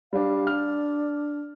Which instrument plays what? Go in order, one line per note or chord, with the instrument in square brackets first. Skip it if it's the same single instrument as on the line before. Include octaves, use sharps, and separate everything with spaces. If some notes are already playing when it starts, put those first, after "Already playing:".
[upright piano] G3 D4 [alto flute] F5
[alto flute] D4 [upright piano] F6